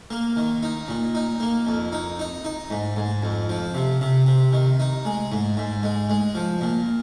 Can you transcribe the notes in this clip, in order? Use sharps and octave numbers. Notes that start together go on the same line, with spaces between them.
A#3
D#3
D#4
A#2
D#4
A#3
F2
D#4
D#4
D#4
G#2
G#2
F2
F3
C3
C3
C3
D#3
D#4
G#3
G#2
G#2
G#3
G#3
F3
A#2